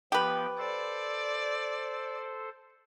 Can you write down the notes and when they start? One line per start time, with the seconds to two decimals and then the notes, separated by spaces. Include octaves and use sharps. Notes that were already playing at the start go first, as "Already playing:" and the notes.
0.12 F3 B3 G4 B4 G5
0.58 A4 C5 D5